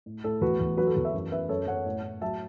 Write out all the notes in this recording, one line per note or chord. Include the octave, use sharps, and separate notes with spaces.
A2
A2 A4
E2 F#4 B4
E2
F#3 F#4 B4
A4
E2 F#4
B4 E5
F#2
F#2 B4 E5
F#2 A4 C#5
F#2 C#5 F#5
A2
A2
F#3 E5 A5